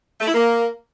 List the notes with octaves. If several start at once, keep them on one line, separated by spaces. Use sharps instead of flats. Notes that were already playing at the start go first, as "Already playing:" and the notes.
A3
E4
A#3